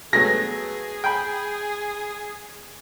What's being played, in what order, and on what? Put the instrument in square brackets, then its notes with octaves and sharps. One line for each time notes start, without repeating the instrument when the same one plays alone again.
[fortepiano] F#3 A3 B3 [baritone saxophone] G#4 [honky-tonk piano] A#6
[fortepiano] G5 G#5 B5